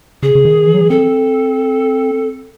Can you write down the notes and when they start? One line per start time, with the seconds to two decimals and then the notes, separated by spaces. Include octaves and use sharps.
0.23 C#3 G#4
0.35 C#3
0.45 D#3
0.67 E3
0.74 F#3
0.81 E3
0.90 C4 A4